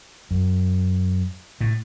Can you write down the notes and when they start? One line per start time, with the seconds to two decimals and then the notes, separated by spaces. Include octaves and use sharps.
0.31 F#2
1.61 A2